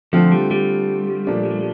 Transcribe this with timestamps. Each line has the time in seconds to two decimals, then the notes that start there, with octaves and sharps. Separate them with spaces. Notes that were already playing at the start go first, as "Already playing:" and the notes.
0.13 D3 F3 A3 C4 F4
0.32 G3
0.51 G3
1.27 A#2 F3 A3 D4